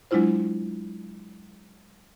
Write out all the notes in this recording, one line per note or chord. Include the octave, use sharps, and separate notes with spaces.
F#3 G#3 D4 E4 F4 C5